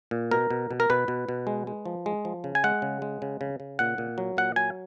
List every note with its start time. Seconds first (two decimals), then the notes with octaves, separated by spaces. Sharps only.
0.11 A#2
0.31 B2 A#4
0.50 B2
0.71 B2
0.80 A#4
0.90 B2 B4
1.08 B2
1.29 B2
1.47 G#3
1.67 G#3
1.86 F3
2.06 G#3
2.25 F3
2.44 C#3
2.55 G#5
2.64 G#3 F#5
2.82 C#3
3.02 G#3
3.22 C#3
3.41 C#3
3.60 C#3
3.79 A#2 F#5
3.98 A#2
4.18 F#3
4.37 A#2 F#5
4.56 F#3 G#5